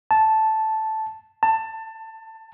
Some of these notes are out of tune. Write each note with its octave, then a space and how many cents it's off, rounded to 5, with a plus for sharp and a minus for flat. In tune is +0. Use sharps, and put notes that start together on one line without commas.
A5 -5
A5 +20